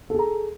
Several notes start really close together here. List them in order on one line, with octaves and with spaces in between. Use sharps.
A4 G#4 A#5